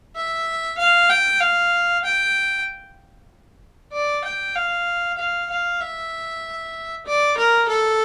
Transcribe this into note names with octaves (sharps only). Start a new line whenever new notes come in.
E5
F5
G5
F5
G5
D5
G5
F5
F5
F5
E5
D5
A#4
A4